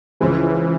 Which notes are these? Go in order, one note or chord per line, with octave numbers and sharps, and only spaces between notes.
C#2 C#3 E3 F3 G#3